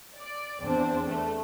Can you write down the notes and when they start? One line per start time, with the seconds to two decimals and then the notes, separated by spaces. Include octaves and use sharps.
0.18 D5
0.62 E2 C4 D4
1.06 A3